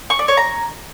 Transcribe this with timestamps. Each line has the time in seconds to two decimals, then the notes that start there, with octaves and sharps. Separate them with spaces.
0.10 C#6
0.19 D5
0.28 C#5
0.37 A#5